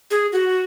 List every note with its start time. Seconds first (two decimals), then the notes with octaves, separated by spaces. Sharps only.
0.11 G#4
0.33 F#4